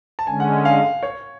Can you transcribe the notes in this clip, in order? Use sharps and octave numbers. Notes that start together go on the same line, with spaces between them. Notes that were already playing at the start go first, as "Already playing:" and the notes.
A5
D3 G#3 C#4 G#5
F#5
F5
C#5